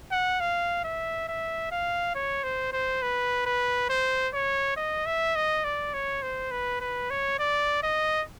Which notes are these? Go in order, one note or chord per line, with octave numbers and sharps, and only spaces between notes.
F#5
F5
E5
E5
F5
C#5
C5
C5
B4
B4
C5
C#5
D#5
E5
D#5
D5
C#5
C5
B4
B4
C#5
D5
D#5